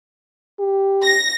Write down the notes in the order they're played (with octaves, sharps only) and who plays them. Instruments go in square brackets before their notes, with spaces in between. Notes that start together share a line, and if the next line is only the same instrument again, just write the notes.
[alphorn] G4
[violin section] A#6